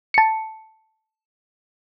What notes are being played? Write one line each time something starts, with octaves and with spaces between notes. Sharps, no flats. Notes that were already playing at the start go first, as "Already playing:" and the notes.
A5 C#7